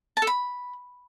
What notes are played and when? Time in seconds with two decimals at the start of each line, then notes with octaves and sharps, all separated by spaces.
0.17 A5
0.22 A4
0.27 B5